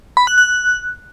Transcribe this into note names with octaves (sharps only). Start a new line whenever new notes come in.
B5
F#6
F#6